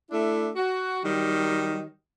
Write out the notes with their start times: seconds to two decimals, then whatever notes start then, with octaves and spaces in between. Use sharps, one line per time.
0.11 A3 D4 E4
0.56 F#4
1.04 D#3 F#3 G3